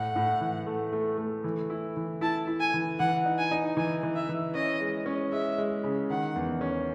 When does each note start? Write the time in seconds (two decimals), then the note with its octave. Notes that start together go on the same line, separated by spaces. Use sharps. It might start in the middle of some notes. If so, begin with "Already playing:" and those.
Already playing: A2 F#5
0.16 A2
0.41 E3
0.67 A3
0.93 A3
1.18 A3
1.44 E3
1.70 E4
1.97 E3
2.21 E4 A5
2.47 E4
2.60 G#5
2.74 E3
2.99 E3 F#5
3.25 D#4
3.39 G#5
3.51 D#4
3.77 E3 G#5
4.03 E3
4.16 E5
4.29 E3
4.55 C#4 D#5
4.80 G#3
5.06 C#4
5.32 G#3 E5
5.58 G#3
5.84 C#3
6.10 D#3 F#5
6.35 E2
6.61 C#4